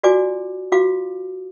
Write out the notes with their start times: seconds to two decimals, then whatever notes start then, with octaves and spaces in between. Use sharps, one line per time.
0.03 F4 F#4 D5 G#5 D6
0.72 F4 F#4 F5 D6